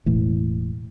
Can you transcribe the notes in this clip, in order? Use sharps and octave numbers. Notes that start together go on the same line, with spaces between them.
E1 A2 E3